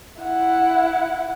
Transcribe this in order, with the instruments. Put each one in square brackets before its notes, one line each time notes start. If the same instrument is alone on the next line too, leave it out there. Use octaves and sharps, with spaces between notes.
[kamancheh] E4 F#5